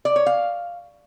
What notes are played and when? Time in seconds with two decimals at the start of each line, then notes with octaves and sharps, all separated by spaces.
0.05 D5
0.16 C#5
0.26 F5